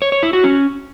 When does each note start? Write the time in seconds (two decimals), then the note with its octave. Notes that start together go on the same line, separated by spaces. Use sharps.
0.02 C#5
0.12 C#5
0.23 E4
0.33 F#4
0.44 C#4